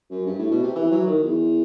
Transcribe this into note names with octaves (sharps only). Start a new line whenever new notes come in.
F#2
G2
A2
B2
C3
E3
F#3
D#3
E2